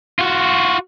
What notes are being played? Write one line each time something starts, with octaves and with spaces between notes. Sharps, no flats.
F4 F#4